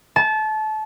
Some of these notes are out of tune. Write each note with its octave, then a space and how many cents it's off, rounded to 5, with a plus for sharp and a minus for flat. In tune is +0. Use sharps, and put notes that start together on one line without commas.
A5 -25